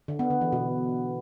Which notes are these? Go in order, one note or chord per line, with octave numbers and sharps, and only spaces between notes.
D3
B3
D3
E3
B2